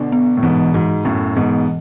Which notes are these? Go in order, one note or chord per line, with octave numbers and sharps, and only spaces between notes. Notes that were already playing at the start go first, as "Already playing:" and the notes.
Already playing: B2 D3 D4
B3
A2
G#2 B2 E3
G#2 F#4
F#2 A2 B3
G#2 B2 E3